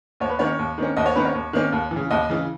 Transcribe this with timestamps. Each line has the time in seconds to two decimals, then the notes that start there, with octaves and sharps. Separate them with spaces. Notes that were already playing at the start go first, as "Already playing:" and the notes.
0.20 D#2 C#5
0.30 B4
0.39 D#3 A#3 C#4 C#5
0.59 D#2
0.78 D#3 A#3 C#4
0.97 D#2 D#5
1.06 C#5
1.16 D#3 A#3 C#4 B4
1.25 C#5
1.34 D#2
1.53 D#3 A#3 C#4
1.72 D#2
1.91 E3
1.96 C#3
2.11 D#2 D#5
2.30 C#3 E3